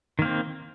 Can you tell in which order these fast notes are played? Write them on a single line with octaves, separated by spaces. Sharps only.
D#3 A#3 C4